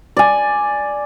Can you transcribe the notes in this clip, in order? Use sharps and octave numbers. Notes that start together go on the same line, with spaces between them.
D5 G#5